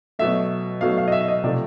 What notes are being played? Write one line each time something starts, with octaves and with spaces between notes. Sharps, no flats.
B2 F#3 A3 E5
B2 F#3 A3 F5
F5
D#5
E5
D#5
C3 F3 A3 D5